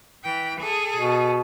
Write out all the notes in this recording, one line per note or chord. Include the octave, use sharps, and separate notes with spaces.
E3 G5
G#4 A4
B2